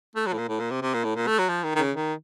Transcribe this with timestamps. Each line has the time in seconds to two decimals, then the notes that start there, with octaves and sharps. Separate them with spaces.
0.16 A3
0.26 F#3
0.33 A2
0.38 A#2
0.48 A2
0.60 A#2
0.71 C3
0.82 C3
0.94 A#2
1.04 A2
1.16 A#2
1.27 A3
1.39 F#3
1.49 F3
1.64 D#3
1.75 D#3
1.78 C#3
1.94 D#3